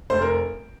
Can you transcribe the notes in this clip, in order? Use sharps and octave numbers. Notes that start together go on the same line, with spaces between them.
F1 C5
A#4